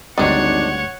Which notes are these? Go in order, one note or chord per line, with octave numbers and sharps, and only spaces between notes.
G#1 D2 G2 D#3 D4 C#5 D5 F#5